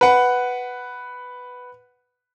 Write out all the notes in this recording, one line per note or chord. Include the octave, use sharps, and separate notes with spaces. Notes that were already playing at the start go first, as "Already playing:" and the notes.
B4 F#5